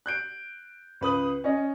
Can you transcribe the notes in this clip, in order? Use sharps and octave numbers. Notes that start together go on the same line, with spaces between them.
F#6 G6 D7
C#2 B4 D#6 F#7
C#4 D#5